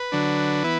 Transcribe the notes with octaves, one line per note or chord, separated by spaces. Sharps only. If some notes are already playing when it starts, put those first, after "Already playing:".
Already playing: B4
D3 F#3 D4
E3 B3 E4